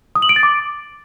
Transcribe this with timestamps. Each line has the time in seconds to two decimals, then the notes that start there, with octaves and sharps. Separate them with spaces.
0.15 D#6
0.22 F#7
0.29 D7
0.36 A6
0.43 D6